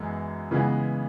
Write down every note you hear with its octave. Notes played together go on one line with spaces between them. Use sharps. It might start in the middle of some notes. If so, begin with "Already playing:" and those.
Already playing: F#2 E3 G#3 B3
C#3 E3 G#3 B3